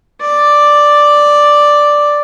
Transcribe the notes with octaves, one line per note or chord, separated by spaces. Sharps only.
D5